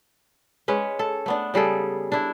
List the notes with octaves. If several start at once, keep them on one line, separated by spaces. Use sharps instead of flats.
G#3 C#4 B4
A4
A3 B3 D4
C#3 G3 G#4 A4
D4 E4